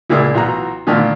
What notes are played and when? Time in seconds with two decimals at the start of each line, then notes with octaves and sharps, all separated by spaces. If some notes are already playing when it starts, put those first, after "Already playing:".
0.10 C#2 A#2 A#3 E4 G#4 D5
0.34 B1 E3 F4 F#4 A#5
0.87 A#2 D3 D#3 A3 D4 F4